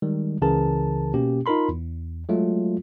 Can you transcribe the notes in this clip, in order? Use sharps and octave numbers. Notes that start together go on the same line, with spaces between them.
D#3 G3 G#3
C#2 C#3 E3 G#4 A#4 A5
B2 A#3 C#4 G4
D#4 F4 A#4 B5 C6
E2
F#3 G#3 A3 F4